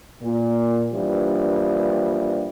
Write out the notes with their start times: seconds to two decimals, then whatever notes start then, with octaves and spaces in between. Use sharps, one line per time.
0.22 A#2
0.93 G2 E3 F3 G3 A#3 D4